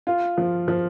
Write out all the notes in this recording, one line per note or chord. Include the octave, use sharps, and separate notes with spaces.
F4
F3
F3